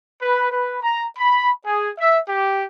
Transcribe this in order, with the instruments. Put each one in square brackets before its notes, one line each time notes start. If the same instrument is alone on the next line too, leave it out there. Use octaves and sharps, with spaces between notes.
[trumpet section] B4
B4
A#5
B5
G#4
E5
G4